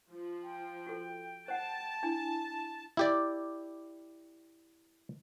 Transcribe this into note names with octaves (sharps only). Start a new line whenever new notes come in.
F3
G5
F#4 A4
C5 F#5 A5
D4 E4 G#5
E4 G4 D5